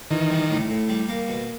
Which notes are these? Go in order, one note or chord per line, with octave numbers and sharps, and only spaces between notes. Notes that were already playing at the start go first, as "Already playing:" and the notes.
D#3 E3
G3
A2
A2
G3
A#3
B2